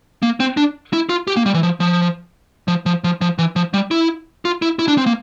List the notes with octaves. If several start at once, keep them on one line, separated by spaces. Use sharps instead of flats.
A#3
C4
D4
E4
F4
G4
A#3
G3
E3
F3
F3
F3
F3
F3
F3
E3
F3
G3
E4
F4
E4
E4
D4
C4
A#3